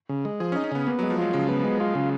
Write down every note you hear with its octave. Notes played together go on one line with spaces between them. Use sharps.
C#3
G#3
F3 G#4
C#4
D#4
C#4
C#3 B3
A#3 B3
F#3
G#3
F3
F#3 F4
C#3 G#3
B3
G#3
F4
C#3